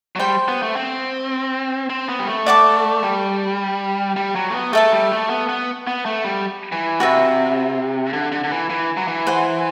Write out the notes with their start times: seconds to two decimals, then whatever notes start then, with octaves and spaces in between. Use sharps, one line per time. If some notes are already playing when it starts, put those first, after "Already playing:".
0.16 F#3
0.20 G3 C5 G5 C6
0.48 B3
0.63 A3
0.76 C4
1.90 C4
2.09 B3
2.19 G3
2.27 A3
2.46 D5 F#5 A5 D6
3.03 G3
4.16 G3
4.35 F#3
4.50 A3
4.54 B3
4.73 A3 A4 E5 A5
4.92 G3
5.11 A3
5.30 B3
5.49 B3
5.87 B3
6.05 A3
6.24 G3
6.72 E3
7.00 C3 F#4 B4 E5
8.13 D3
8.32 D3
8.44 D3
8.51 E3
8.70 E3
8.97 F#3
9.08 E3
9.27 C5 F#5 C6